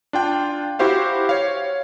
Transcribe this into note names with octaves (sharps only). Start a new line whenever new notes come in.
D4 F4 G5
E4 F#4 G4 C5 F5
C#5 F5